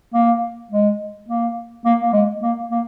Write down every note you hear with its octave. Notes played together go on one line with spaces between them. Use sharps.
A#3
G#3
A#3
A#3
A#3
G#3
A#3
A#3